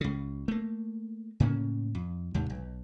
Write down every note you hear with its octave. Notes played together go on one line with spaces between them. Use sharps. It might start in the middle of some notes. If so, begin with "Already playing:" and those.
C#2 C#3
A3 A#3
A2 C#3 A#3 C#4
F2
D#2 G#2 C3
B1